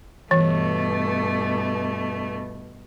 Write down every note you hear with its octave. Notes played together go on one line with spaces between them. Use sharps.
G2 B2 E3 A3